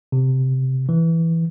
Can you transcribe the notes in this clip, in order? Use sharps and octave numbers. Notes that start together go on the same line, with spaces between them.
C3
E3